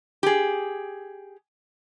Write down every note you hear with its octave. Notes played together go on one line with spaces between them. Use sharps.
G4 G#4